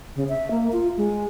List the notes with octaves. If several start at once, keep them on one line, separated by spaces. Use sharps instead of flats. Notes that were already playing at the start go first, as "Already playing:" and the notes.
C#3
E5
A#3
F4
G#3